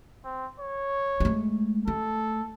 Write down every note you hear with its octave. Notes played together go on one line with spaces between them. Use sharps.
C4
C#5
G#3 A3
A3 A4